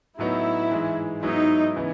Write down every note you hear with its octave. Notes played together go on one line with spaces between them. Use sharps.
A2 F#3 B3 D#4 E4
G#2 E3 G#3
G#2 F#3 B3 D#4 E4
C#3 E3 B3 E4